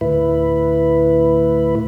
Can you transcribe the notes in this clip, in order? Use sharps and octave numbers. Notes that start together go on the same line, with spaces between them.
D2 A2 E4 B4